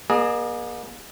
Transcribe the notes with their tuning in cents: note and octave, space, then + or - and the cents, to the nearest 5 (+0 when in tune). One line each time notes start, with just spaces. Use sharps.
A#3 +35 G#4 +0 D#5 -30